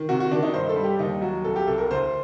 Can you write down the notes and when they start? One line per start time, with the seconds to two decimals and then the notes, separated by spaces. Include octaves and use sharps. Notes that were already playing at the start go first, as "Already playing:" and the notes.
Already playing: D#3
0.09 C3 F#4
0.20 F#4
0.31 D#3 D4
0.43 D#4
0.54 G2 C5
0.69 A4
0.76 G3
0.84 G4
0.99 D#2 D#4
1.21 F#3 F#4
1.44 C2 A4
1.56 G4
1.67 C2 A4
1.78 A#4
1.90 D2 C5